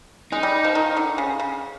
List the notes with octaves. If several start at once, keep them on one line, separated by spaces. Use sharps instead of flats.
G#3 D#4
G3
F3
D#3
D3
C#3
C#3